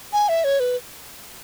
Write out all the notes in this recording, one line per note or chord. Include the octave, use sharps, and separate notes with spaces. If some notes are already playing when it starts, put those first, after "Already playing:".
G#5
E5
C#5
B4